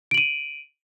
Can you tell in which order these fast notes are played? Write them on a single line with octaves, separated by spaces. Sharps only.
D7 F#7 D#7